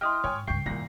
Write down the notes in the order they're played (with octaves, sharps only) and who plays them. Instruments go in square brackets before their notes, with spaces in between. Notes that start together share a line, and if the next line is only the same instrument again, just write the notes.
[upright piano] E4 D#5 G5 [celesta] C6 D#6 F6
[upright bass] G#2 [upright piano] C#5 G5 G#5
[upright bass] C#2 G2 [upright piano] G5 C#6 G6 [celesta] C7
[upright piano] C2 A#2 A#6 [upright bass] F#2 D#3